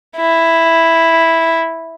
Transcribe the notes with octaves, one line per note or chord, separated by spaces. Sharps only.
E4